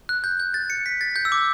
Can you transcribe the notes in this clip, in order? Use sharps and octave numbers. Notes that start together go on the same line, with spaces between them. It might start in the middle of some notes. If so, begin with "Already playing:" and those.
F#6
G6
G6
A6
C#7
B6
A6
G6
E6
D6